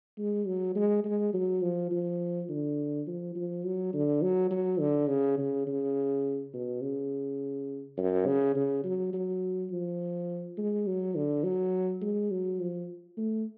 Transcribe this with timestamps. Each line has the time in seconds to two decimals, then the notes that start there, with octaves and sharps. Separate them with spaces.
0.18 G#3
0.47 F#3
0.76 G#3
1.05 G#3
1.34 F#3
1.62 F3
1.91 F3
2.49 D3
3.07 F3
3.35 F3
3.65 F#3
3.94 D3
4.22 F#3
4.51 F#3
4.80 D3
5.09 C#3
5.38 C#3
5.67 C#3
6.54 B2
6.82 C#3
7.98 F#2
8.27 C#3
8.56 C#3
8.84 F#3
9.14 F#3
9.71 F3
10.58 G#3
10.87 F#3
11.16 D3
11.44 F#3
12.02 G#3
12.31 F#3
12.60 F3
13.18 A3